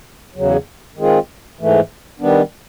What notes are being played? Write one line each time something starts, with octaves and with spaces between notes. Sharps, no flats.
E2 C#3 F#3
D#3 G#3 C4 F4 G#4
G#2 E3 A3
D#3 G3 B3 D4